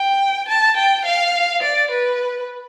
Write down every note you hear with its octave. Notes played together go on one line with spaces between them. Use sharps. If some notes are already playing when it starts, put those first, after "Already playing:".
Already playing: G5
A5
G5
F5
D5
B4